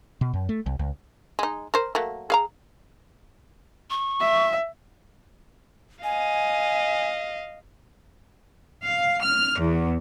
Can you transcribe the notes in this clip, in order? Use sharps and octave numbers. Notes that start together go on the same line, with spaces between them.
B2
F#2
A3
C2
C#2
G#3 D#4
A#4 C5
F#3 A3 A#3
G#4 F5 A#5
C#6
E5
D#5 F5 G#5
F5
F6
E2